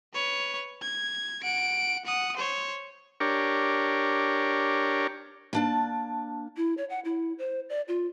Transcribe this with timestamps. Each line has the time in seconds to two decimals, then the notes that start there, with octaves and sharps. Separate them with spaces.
0.14 B4 C#5
0.82 G#6
1.43 F#5 D7
2.05 F#5 D#6
2.37 C5 C#5
3.20 D4 G4 A#4 C#5
5.53 A#3 D4 A5
6.57 E4
6.77 C#5
6.90 F#5
7.05 E4
7.38 C5
7.69 D5
7.88 F4